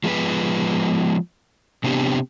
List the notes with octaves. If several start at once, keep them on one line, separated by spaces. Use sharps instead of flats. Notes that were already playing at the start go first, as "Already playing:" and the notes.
F3 G#3 B3 D4 B4
C3 B3 C4 D4 G4